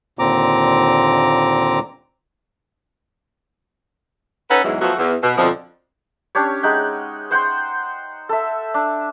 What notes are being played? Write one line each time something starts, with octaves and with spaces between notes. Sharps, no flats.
D#2 A#2 D3 C4 A#5 D6
C#4 D#4 A4 B4 F#5
E2 G#2 E3 F#3 G#3
F3 F#3 A3 B3 F#4
E2
B2
F2 B2 D3 F3 D#5
C#4 D4 G4 C#5
G#3 D#4 F#5 G5
C5 F#5 G5 C6
A4 E5
D4